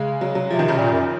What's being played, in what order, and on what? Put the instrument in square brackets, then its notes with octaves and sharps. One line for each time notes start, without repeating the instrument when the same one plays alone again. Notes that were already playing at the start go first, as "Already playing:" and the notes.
Already playing: [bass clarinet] C#3 [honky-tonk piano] G#3
[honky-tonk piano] F#3
F#3
[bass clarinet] C3 [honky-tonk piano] F3
[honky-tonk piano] D#3
C#3
[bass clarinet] A#2
F#2